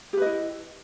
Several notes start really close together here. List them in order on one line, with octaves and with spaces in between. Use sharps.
G4 B4 D#5 E4